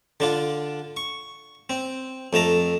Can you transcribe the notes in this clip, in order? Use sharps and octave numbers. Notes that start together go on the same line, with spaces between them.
D3 D4 F4
C#6
C4
F2 A3 A5 A#5